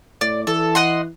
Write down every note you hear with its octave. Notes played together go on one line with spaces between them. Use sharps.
A2 D5
E3 A4
D#5 F#5 C6